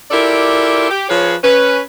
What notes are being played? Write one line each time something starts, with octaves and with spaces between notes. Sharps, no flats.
E4 F4 G4 A4 A#4 D5
G4
F3 G#4 B4 C#5
C#4 B4